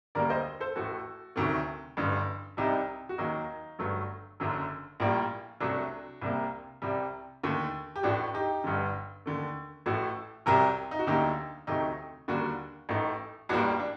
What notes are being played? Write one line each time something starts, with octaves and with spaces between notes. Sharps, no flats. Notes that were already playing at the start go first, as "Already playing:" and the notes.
D2 D3 G3 A#3 A#4 D5
C5 D#5
A4 C5
A1 A2 A3 F#4 A4
D2 C3 D#3 F#3 A3
A1 G2 D3
C2 C3 G3 D#4 G4
F#4
D#2 D#3 F#3 A#3 D#4
G1 G2 F#3 A3
F#1 F#2 D3 F#3
A#1 A2 G3 A#3
C2 C3 F#3 A3 D4 F#4
C2 C3 G3 A#3
C2 C3 G3
D#2 D3 A3
G4
A1 A2 A3 D4 F#4
D#4 G4
G1 G2 D3
D#2 D3 A3
A1 A2 A3 F#4 A4
C2 C3 F#3 G4 A#4
D#4
F#4
D2 D3 F#3 A#3 D#4 G4
D2 C3 F#3 A3 D#4 G4
D#2 D3 G3 A#3 D4 F#4
A1 A2 A3 D#4
A1 A2 G3 A#3 D4 F#4
D4